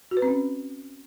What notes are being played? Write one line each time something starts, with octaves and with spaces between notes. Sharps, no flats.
F#4
B4
C4
C#4